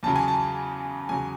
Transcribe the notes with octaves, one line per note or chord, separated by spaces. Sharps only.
E2 C#3 F#3 A5
G#5
A5
E2 C#3 F#3 G#5